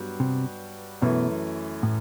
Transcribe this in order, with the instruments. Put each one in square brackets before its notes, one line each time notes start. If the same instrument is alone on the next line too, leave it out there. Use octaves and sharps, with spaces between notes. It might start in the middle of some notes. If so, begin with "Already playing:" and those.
Already playing: [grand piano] G2 F#3 B3 F#4
[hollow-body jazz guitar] C3
[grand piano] F#2 E3 A3 [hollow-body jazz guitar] B2
[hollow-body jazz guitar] A2